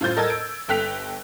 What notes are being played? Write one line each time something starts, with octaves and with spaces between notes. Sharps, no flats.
A2 F4 C5 G6 A6
A4 A#4 D#5 A5 E6 G#6
D7
G1 A4 G5 F#6 B6 F7